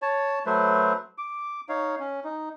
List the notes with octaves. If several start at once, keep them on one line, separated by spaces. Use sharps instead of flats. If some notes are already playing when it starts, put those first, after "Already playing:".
C#5 A5
F#3 A3 B4 C5
D6
D#4 C#5 F5
C#4
D#4